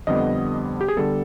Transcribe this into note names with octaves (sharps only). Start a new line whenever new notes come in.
F2 D3 G3 B3 D#5
G4
G#4
D3 G3 B3 A4